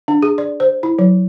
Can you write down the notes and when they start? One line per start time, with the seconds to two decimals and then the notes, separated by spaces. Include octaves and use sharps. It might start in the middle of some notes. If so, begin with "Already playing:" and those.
0.08 D4
0.22 G#4
0.38 D5
0.60 C5
0.83 E4
0.99 F#3